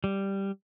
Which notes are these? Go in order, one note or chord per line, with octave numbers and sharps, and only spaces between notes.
G3